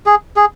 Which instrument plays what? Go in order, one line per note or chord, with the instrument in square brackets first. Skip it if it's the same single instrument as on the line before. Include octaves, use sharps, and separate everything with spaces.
[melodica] G#4
G#4